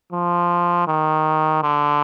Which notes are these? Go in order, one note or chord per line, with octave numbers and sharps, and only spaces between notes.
F3
D#3
D3